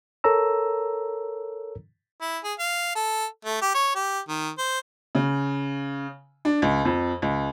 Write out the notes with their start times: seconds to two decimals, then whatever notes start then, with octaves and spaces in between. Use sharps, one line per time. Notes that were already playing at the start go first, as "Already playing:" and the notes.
0.24 A4 A#4 C#5 A#5 E6
2.21 E4
2.44 G#4
2.59 F5
2.96 A4
3.45 A3
3.62 G4
3.75 C#5
3.95 G4
4.29 D#3
4.58 C5
5.15 C#3
6.45 D4
6.62 C#2
6.85 F2
7.22 C#2